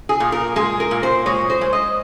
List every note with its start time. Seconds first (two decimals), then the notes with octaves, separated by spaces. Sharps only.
0.09 G#4
0.20 A#2
0.32 A#4
0.56 G#3 G#4
0.80 A#4
0.91 A#2
1.03 C5
1.26 G#3 C#5
1.50 C5
1.61 G#3
1.73 D#5